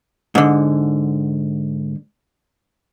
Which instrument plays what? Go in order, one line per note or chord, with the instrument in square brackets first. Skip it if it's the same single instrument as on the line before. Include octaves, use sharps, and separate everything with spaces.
[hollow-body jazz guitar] G#2 D3